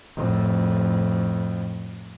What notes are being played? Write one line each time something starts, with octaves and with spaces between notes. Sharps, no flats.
F2 A2